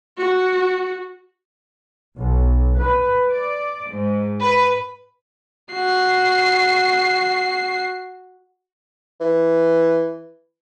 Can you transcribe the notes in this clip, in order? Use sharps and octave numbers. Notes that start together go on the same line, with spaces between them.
F#4
B1
B4
D5
G#2
B4
F#4 C7
E3